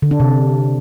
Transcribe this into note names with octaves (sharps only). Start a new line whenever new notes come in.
D3
D4
C3